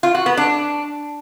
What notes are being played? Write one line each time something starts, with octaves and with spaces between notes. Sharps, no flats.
F4
F#4
B3
D4